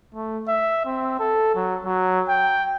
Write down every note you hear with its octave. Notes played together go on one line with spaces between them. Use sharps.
A3
E5
C4
A4
F#3
F#3
G5